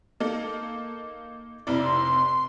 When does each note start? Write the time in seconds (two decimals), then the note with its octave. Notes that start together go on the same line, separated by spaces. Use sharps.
0.20 A#3 D#4 A4
1.67 F1 C3 E4 D5
1.83 C6